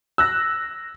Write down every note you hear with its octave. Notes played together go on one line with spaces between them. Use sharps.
E6 F#6 A#6